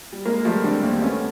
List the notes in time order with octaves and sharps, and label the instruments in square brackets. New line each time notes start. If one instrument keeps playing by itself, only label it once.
[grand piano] G3
[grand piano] G#3 [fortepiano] A#3
[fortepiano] F3 [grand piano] G3 A3
[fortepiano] D3 [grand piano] C4 D4
[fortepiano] D#2 [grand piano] A#3 C4
[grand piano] A3 B3 [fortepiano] C#4